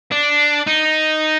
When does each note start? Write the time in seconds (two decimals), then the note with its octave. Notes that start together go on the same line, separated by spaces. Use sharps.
0.12 D4
0.67 D#4